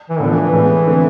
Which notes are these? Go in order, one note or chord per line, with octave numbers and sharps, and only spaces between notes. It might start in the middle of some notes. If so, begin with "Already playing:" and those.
E3
A2 D3 F3 B3 D4
E3
E3
A2 G#3 B3
D3 A3 C4